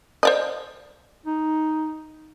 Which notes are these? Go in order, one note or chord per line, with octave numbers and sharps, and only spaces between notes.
C5 D5 D#5
D#4